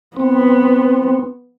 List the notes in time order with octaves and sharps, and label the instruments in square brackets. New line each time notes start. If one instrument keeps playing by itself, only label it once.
[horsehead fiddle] B3 [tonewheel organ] C4